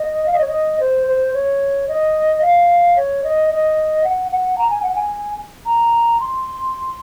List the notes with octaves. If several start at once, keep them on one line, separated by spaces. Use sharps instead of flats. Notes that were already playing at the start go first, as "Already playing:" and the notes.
Already playing: D#5
F5
D#5
C#5
D#5
C5
C5
C#5
D#5
F5
C#5
D#5
D#5
F#5
F#5
A#5
G#5
F#5
G#5
A#5
C6